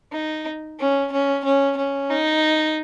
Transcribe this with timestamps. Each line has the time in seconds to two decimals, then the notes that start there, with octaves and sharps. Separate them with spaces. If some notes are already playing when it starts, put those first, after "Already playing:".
0.12 D#4
0.79 C#4
1.12 C#4
1.45 C#4
1.77 C#4
2.10 D#4